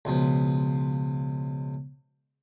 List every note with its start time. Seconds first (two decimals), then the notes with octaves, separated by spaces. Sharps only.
0.05 C#2 B2 F3